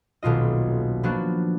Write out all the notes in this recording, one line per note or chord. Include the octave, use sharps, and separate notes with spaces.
D#1 B1 B2 F4 D#5
F3 F#3 A#3 B3 D4 F#4